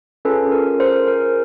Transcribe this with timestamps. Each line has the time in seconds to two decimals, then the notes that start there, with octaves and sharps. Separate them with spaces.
0.25 C#4 F4 G#4 A4 B4
0.52 A#4
0.80 A#4 C5
1.08 A#4